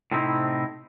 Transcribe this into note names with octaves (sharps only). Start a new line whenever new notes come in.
A2 C3 C4 D#4 E4